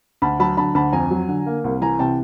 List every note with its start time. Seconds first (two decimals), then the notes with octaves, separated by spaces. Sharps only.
0.22 D2 A5 B5
0.39 F#3 A5 B5
0.57 D3 A5 B5
0.75 D2 A5 B5
0.92 F2 G#5 A#5
1.11 F#3
1.29 D3
1.46 A#3
1.64 C2
1.82 E3 G#5 A#5
1.99 C3 G5 A5